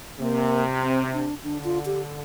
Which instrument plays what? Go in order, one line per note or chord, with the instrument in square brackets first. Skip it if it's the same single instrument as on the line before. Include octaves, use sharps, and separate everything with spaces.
[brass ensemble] C3 [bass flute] A#3
[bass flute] C4
D4
[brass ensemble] D3 [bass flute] D4
[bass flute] F4
G4